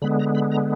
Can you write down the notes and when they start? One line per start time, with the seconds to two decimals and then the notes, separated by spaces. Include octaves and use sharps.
0.02 D3 G#3 B3 B5
0.19 A#5
0.35 B5
0.52 A#5